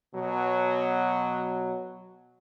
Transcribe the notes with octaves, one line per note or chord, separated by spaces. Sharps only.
B2 F#3